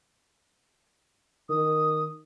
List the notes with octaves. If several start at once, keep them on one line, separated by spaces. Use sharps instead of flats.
D#3 D#6